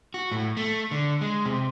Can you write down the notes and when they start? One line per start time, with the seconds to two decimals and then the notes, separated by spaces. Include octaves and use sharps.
0.14 F#4
0.32 A2
0.57 A3
0.91 D3
1.21 G#3
1.45 C3